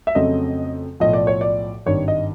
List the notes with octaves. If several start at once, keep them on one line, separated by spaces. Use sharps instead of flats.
E5
F2 C#3 F#3 A3 C4 D#5
B1 A2 F3 D#5
D5
C#5
D5
G#1 G2 D#3 C#5
D#5